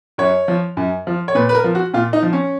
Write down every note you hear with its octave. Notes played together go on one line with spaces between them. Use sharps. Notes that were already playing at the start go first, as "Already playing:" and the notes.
F#2 C#5
F3
F#2
F3
C#5
A#2 B4
B4
A#4
F3
F#4
A#2 F4
D#4
F3
C#4